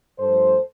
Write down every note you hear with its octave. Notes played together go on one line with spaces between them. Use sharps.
G2 F3 A3 A4 C5